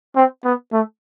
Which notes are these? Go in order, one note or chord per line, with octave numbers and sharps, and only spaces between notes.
C4
B3
A3